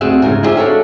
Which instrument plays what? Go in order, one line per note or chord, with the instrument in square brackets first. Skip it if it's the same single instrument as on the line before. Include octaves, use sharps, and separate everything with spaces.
[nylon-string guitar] D2 C4 F#4 G#4 E5 F5
G#2 C#3 C#4 A#4
E4 F4 G4 G#4 C5 E5
D4 F#4 A4 A#4 C#5 E5